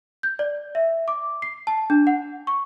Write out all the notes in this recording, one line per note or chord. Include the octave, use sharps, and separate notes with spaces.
G6
D5
E5
D6
C7
A5
D4
F#5
C#6